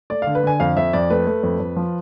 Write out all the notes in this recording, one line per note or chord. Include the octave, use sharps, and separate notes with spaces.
A3 D5
D3 F5
B4
D3 G#5
F2 F5
F2 E5
F2 D5
A3 B4
A3
F2
F2
F3